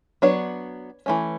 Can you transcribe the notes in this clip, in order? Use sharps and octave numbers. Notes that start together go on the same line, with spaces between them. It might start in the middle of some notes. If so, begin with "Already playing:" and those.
F#3 B3 D4 C#5
E3 A3 C#4